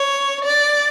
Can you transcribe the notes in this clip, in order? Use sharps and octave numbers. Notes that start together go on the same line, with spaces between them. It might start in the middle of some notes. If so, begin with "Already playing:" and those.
Already playing: C#5
D5